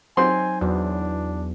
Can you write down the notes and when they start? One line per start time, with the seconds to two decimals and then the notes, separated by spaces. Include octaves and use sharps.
0.17 F#3 C4 D#4 G#5 C6
0.61 E2 F#3 D4